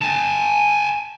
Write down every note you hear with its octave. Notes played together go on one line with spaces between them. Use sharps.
G#5 A5